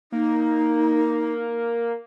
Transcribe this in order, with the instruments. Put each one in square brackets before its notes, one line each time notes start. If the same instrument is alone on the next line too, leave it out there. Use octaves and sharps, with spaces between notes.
[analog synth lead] A#3 [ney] D#4